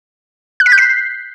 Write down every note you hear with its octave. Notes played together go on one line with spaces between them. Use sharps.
F#6
B6
G6
C7